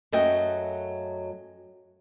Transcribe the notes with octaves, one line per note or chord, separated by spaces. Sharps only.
F#2 F#3 A3 D#5 E5 G5